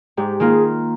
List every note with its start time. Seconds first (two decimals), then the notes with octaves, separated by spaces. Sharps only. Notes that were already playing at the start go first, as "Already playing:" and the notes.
0.17 G#2 G4
0.40 D#3 A#3 F4 G#4